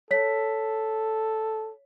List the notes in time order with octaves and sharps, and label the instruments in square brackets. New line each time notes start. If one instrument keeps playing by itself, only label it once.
[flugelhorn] A4 [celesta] C#5 B6